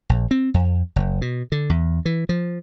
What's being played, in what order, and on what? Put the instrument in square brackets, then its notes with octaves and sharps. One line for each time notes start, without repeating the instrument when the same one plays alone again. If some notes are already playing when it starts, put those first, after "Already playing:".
[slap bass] A#1
C4
F2
F#1
B2
D3
E2
E3
F3